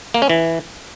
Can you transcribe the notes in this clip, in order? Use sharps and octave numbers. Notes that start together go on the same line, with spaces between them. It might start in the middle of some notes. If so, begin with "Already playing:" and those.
A#3
C#4
E3